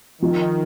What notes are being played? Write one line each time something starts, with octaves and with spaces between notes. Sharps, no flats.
D#3 F3